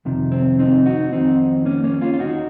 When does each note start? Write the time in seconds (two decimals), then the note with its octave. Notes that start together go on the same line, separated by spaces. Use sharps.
0.05 F2 C3 D#3
0.32 C4
0.59 C4 D#4
0.86 D#4 F#4
1.12 F2 D#3 C4 D#4
1.65 A#3 C#4
1.84 A#3 C#4
2.01 C#4 F4
2.14 F4
2.19 D#2 D#3 D#4 F#4